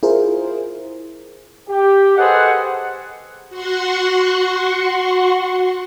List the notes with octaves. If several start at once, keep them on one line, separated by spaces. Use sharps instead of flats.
E4 F4 G#4 A#4 C5
G4
G#4 A4 B4 C5 D#5 F#5
F#4 F#5 C6 C#6